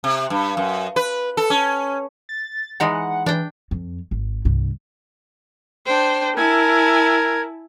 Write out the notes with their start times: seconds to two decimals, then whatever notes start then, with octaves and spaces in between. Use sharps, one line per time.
0.04 C3
0.30 G2
0.57 F#2
0.96 B4
1.37 A4
1.50 C#4
2.29 A6
2.80 E3 G#3 D#4 F#5
3.26 E3 D4 G5
3.71 F2
4.11 G#1
4.45 C2 G2
5.86 D4 C5 G5
6.37 E4 A#4 G#5 A5 G#6